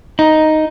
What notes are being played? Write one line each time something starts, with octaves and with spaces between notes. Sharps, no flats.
D#4